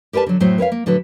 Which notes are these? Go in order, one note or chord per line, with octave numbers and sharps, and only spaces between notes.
G4 A#4 B4 D5 A5
D3 F#3
A2 F#3 C4 F#4 C5
A#4 B4 C#5 F5
A#3
A2 D3 F#3 F#4 B4